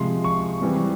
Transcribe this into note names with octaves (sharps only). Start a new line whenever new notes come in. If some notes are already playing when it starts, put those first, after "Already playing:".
Already playing: C3 F3 G#3 C6
C#6
E3 G3 C4